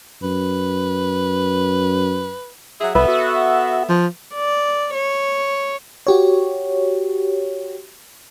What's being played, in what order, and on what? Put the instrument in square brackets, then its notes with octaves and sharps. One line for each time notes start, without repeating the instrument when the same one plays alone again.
[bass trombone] F#2 [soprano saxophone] B4
[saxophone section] F#3 G#4 E5
[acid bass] C2 [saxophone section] B3 A4 E5 [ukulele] B4
[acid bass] F#4
[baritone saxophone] F3
[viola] D5
C#5
[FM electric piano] F#4 G4 C#5